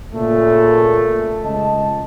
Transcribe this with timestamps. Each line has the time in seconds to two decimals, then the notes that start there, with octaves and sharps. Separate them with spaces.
0.13 A#2 C#3 A3
1.44 C#2 D#5 A5